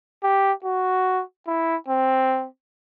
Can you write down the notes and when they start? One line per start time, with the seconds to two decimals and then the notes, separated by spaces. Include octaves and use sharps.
0.23 G4
0.64 F#4
1.47 E4
1.88 C4